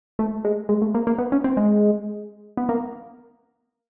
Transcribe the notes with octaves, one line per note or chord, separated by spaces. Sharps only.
A3
G#3
G#3
A3
A#3
A#3
B3
C#4
C4
G#3
B3
A#3